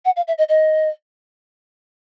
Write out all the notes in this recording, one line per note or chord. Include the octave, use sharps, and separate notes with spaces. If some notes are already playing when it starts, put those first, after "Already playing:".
F#5
F5
E5
D#5
D#5